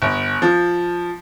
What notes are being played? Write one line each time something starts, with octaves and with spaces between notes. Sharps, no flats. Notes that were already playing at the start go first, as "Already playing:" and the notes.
G1
F3